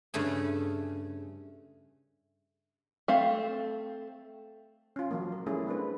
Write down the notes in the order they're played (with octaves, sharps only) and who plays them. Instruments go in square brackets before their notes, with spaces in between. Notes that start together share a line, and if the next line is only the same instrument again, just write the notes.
[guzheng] G2 C#3 A3 G#4
[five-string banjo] A3 C4 F5
[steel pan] C#4 F4
F3 F#3 A#3
A#4
G3 A3 C#4 E4 G#4
C4 D4 B4